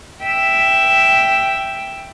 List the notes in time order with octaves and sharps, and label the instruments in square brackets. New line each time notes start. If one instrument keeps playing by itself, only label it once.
[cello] E5 G5